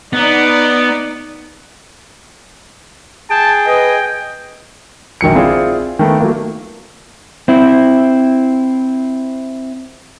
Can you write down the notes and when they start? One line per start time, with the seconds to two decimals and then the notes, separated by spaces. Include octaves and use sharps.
0.13 B3 D#4 D5
3.30 G#4 G5 A5
3.67 B4 D#5
5.21 A#1 D#3 F#3 C#7
5.35 C4 E4 F4 G#4 D5
5.99 D#3 A3 B3
6.20 F#3 A3 A#3
7.48 C4 E4